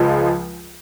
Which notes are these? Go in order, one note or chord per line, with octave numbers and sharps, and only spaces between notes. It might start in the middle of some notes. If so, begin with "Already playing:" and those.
Already playing: C#2 F3 G#3